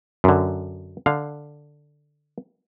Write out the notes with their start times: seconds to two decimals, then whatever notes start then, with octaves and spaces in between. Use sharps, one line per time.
0.24 F#2 D3
1.06 D3 F5